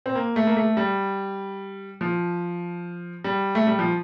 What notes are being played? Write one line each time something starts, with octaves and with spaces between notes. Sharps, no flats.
C4
A#3
A3
A#3
A3
G3
F3
G3
A3
G3
F3